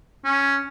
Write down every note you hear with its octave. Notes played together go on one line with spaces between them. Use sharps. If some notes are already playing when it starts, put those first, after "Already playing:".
C#4